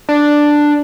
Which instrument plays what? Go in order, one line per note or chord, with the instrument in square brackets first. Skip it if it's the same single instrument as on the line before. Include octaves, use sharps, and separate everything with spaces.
[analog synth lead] D4